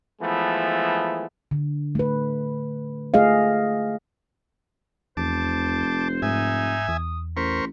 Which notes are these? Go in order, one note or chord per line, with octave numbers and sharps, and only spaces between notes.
E3 F3 G#3 A3 B3
D3
A3 B4
A3 G#4 D#5 F5
F1 E2 C5 A5 D6
G#2 D#4 E5 G#5
E2 D#6
A1 A#4 C5 B5 C#6